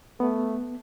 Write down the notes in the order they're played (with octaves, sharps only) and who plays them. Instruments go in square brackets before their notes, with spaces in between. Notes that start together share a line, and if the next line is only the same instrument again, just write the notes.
[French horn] A3 [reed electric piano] B3